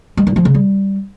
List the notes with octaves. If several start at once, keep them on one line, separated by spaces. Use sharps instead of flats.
G#3
G2
F3
C#3
G3